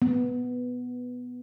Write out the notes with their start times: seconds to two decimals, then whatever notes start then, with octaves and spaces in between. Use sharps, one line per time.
0.02 B3